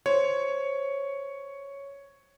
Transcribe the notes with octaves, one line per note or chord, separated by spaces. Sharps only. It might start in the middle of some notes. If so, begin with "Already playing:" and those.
C5 C#5